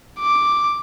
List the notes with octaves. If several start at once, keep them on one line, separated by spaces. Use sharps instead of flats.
D6